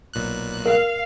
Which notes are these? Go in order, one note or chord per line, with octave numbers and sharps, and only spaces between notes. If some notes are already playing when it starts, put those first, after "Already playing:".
B1 A#2 F#6
A#4 F5